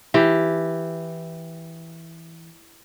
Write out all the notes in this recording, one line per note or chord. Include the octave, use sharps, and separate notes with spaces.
E3 G4